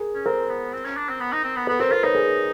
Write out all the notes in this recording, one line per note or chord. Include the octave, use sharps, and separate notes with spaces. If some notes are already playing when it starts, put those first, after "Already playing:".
Already playing: G#4 A#4
C#4
C4 A#4 C5
B3
C4
C#4
D4
C4
B3
D#4
C4
B3
B3 A4 B4
C4 A#4 C5
F4 A#4 C5
D#4 B4 C#5
G#4 A#4